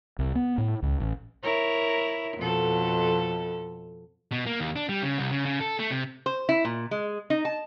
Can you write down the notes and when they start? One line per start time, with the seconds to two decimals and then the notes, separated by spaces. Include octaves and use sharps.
0.19 C2
0.35 B3
0.58 A2
0.82 C#2
1.00 A1
1.43 E4 A#4 C#5
2.37 F2 B2 A4
4.32 B2
4.46 A#3
4.60 D#2
4.76 D4
4.89 G3
5.03 C#3
5.18 C2
5.31 C#3
5.45 C#3
5.60 A4
5.79 A3
5.91 C3
6.26 C5
6.49 E4
6.65 A#2
6.91 G#3
7.30 D#4
7.45 A5